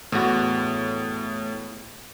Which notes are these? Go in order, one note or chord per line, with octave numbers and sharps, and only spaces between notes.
E2 A2 F#4